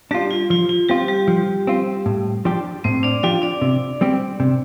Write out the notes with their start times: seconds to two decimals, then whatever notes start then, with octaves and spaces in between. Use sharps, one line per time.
0.11 G3 D4 F4 G4
0.31 F4
0.50 F3 F4
0.69 F4
0.89 G3 C4 F4 G4
1.08 G3 G4
1.28 F3
1.67 C4 F4
2.06 A2
2.45 F3 D4 G4
2.84 A2 C4 C5
3.03 D4 D5
3.23 F3 D4 F4 G4 F5
3.42 D4 D5
3.62 C3
4.01 G3 C4 G4
4.40 C3